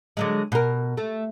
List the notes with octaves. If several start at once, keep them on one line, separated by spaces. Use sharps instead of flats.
D3 F#3 G#3
B2 A#4
A3